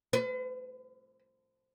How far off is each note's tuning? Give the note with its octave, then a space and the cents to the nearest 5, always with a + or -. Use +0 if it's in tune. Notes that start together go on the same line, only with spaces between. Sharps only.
B4 +45